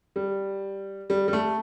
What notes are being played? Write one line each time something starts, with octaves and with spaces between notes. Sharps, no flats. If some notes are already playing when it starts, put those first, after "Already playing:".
G3
G3
G3
A3